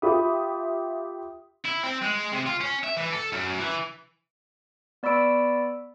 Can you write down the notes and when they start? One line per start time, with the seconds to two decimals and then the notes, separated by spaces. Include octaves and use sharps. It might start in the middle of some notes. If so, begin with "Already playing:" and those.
0.02 F4 G4 E5 B5 D#6
1.65 E4
1.83 C4
2.02 G#3
2.32 C3
2.47 F4
2.61 C#4
2.84 E5
2.97 E3
3.13 A4
3.32 F#2
3.59 E3
5.03 B3 D5 B5 C#6 E6 D7